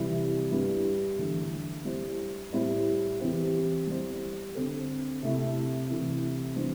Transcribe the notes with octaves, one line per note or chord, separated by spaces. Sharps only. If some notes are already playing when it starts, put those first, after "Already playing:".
Already playing: C3 E3 G3 E4
G2 G3 E4
E2 D3 A3
G3 E4 G4 C5
A2 G3 E4 G4 C5
E2 E3 C4 G4
G3 E4 C5
D3 C4 A4
C3 A3 E4
C3 E3 A3 E4
E3 G3 D4 C5